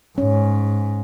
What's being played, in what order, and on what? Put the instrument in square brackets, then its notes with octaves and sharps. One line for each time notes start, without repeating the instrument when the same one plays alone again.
[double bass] G#2 [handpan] C#4